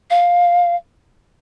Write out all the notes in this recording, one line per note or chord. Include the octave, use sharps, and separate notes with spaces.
F5